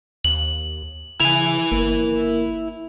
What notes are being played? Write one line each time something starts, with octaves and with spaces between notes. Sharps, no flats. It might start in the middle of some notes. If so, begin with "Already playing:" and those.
D#2 F#7
C#3 E4 G#5 F7
G1 A#3